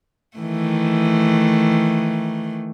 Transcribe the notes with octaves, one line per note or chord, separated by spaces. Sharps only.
D#3 E3 A3